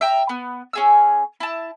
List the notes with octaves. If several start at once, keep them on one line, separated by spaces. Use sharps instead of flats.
E5 G5 A#5
B3
C#4 G#4 E6
E4 A5